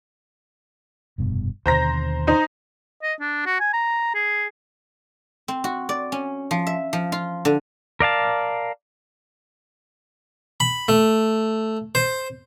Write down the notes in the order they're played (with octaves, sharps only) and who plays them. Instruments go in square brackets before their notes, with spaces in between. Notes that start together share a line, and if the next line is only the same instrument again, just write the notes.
[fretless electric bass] F1 G2 B2
[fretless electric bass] D#2 B2 D3 [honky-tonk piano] C5 A#5 A#6
[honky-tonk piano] D#4 C5
[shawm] D#5
D4
F#4
G#5
A#5
G#4
[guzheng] C4
F#4
D5
C#4
F3
E5
F3
F4
D3
[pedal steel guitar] A#4 D5 F5 A5
[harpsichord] B5
A3
C5